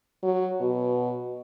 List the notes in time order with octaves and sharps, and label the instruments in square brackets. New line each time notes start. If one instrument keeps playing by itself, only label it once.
[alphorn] F#3
B2